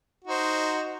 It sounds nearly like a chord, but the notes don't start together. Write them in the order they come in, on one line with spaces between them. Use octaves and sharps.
F#4 D#4 C5